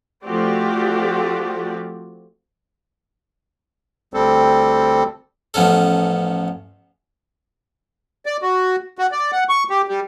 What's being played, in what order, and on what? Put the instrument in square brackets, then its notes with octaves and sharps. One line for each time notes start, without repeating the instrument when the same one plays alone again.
[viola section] F3 A3 C4 F#4 G4 D5
[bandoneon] D2 G3 C4 A4
[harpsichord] A1 F3 B3 C#4 A4
[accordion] D5
F#4
F#4
D5
F#5
C#6
G4
G3